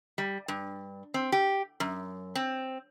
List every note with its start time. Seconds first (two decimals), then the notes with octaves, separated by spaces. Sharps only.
0.18 G3
0.48 G2
1.14 C4
1.32 G4
1.80 F#2
2.35 C4